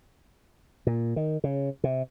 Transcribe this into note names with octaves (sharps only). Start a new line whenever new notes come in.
A#2
D#3
C#3
C3